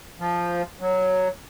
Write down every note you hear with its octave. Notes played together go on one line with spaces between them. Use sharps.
F3
F#3